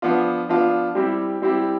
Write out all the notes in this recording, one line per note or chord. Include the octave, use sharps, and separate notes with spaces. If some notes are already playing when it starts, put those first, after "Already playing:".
F3 B3 D4 F4
F3 B3 D4 F4
G3 C4 E4 G4
G3 C4 E4 G4